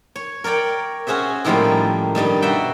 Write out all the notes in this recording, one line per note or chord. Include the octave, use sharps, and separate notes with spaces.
C#5
A#4 C#5 D5 G5
C#4 F#4 G#4 C5 E5
A2 D#3 F3 G3 G#3 A#3
G2 D#3 G3 D#5
B2 F#4 D5 E5 G5